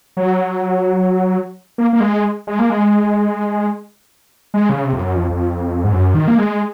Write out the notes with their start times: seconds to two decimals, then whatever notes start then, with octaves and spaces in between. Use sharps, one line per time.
0.17 F#3
1.78 A#3
1.93 A#3
2.00 G#3
2.47 G#3
2.59 A#3
2.70 G#3
4.54 G#3
4.69 C#3
4.84 C3
4.93 F2
4.99 F#2
5.15 F2
5.30 F2
5.84 G#2
5.92 F#2
6.14 D#3
6.28 A#3
6.38 G#3